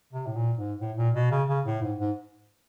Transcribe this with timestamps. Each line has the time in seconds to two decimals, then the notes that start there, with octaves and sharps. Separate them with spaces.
0.13 C3
0.27 A2
0.36 A#2
0.58 G#2
0.80 A2
0.97 A#2
1.14 B2
1.31 C#3
1.49 C#3
1.66 A2
1.82 G#2
1.99 G#2